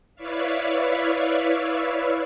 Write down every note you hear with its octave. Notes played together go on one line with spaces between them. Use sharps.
E4 B4 C#5 D5 E5 F5